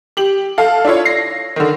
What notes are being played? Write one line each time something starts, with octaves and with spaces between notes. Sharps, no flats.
G4 F#7
A4 F5
D4 E4 F4 C#5
A#6 C7
D3 D#3